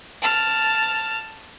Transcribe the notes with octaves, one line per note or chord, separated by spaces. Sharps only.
A5 F6